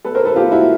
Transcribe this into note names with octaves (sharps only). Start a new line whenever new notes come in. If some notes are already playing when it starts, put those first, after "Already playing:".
A4 B4
A#4 C5
A4 B4
F4 G4
E4 F#4